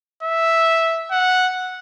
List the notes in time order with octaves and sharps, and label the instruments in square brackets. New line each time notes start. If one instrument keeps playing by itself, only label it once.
[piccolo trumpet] E5
F#5